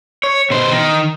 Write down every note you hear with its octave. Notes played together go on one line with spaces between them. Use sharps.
C#5
B2 C5
D#3